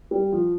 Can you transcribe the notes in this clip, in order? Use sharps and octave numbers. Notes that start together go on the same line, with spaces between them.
G3
F3